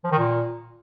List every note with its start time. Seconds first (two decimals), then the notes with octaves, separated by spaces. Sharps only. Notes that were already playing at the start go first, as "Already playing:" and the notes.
0.04 F3
0.11 D#3
0.18 A#2